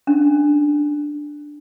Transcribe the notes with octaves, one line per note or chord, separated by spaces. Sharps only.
C#4 D4